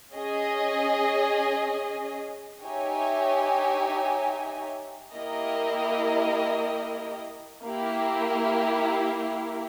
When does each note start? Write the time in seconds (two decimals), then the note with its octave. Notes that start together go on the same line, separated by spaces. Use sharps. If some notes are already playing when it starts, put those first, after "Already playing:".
0.13 C#4 G#4 D#5
2.64 D#4 G4 C#5 E5 G#5
5.13 A#3 E4 G4 A#4 D#5
7.64 A#3 E4 G4